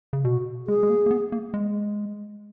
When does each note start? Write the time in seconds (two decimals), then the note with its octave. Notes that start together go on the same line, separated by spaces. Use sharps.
0.13 C#3
0.24 B2 F#4
0.67 G#3 G#4
0.83 G#3
0.90 A#3
1.06 A#3
1.11 B3
1.32 A#3
1.54 G#3